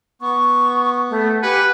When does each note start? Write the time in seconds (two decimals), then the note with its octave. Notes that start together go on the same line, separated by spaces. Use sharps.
0.21 B3 C#6
1.10 A3
1.43 G4 B4 F#5 G#5